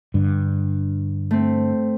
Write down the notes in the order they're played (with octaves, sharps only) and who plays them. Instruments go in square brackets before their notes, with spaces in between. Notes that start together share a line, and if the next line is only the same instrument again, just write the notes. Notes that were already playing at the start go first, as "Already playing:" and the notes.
[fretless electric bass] G2 D3
[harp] A3 C4